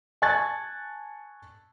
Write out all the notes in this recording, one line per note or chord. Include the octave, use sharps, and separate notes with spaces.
G#5 A5 C#6 F#6 G#6 A6